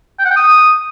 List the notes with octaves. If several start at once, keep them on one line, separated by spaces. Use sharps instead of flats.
G5
F#5
G5
D#6